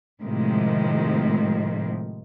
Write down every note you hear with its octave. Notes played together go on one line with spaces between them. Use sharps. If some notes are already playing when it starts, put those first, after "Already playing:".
A2 C3 D#3 F3 G#3